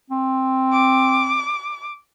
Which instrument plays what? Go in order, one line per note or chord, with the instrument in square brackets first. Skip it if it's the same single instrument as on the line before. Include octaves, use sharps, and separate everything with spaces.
[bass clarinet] C4
[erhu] D6